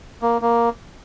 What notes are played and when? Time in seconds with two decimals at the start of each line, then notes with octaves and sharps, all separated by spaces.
0.22 A#3
0.42 A#3